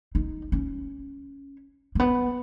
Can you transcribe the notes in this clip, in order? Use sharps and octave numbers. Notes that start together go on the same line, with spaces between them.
D#4
C#4
A#3
B3